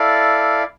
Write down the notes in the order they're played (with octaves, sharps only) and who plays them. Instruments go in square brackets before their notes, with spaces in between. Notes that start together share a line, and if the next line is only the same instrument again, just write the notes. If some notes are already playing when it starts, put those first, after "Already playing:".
Already playing: [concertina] E4 A4 D5 F5